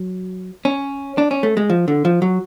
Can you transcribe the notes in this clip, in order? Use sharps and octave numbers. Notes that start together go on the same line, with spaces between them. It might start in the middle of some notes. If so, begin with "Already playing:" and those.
Already playing: F#3
C#4
D4
C#4
A3
G#3
F3
D3
F3
F#3